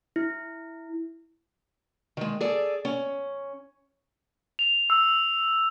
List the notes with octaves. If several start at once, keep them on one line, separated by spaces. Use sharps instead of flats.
E4
D#3 G#3
G#4 A4 D5
C#4
F7
E6